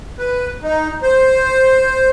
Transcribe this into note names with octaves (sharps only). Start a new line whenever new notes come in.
B4
D#4
C5